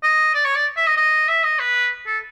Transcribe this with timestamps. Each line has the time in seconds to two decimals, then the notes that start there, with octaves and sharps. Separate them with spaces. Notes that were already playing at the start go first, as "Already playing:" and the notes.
0.03 D#5
0.34 D5
0.45 C#5
0.56 D5
0.76 E5
0.86 D#5
0.97 D#5
1.28 E5
1.44 D#5
1.59 B4
2.06 A4